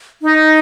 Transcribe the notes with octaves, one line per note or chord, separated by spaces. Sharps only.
D#4